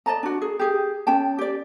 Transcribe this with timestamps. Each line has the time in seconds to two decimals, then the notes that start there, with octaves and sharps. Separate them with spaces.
0.06 D5 D#5 A5 A#5
0.23 D4 F#4
0.42 G#4
0.59 G4 G#4
1.07 C#4 G5 A5
1.38 G4 D5